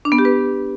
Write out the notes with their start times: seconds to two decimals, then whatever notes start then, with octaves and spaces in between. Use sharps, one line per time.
0.05 D4
0.12 B3
0.18 G4
0.25 B4